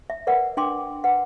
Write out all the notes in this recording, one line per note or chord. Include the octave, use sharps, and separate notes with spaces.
E5
A#4 B4 D5 F#5
D4 G5 C6 D6
B4 F#5